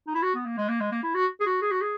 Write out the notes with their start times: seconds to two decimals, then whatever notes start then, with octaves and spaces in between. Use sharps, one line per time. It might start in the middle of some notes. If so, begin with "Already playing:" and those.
0.07 D#4
0.15 E4
0.22 F#4
0.35 B3
0.45 A#3
0.58 G#3
0.69 A#3
0.80 G#3
0.92 A#3
1.03 E4
1.15 F#4
1.40 G#4
1.46 F#4
1.61 G#4
1.71 F#4
1.81 G#4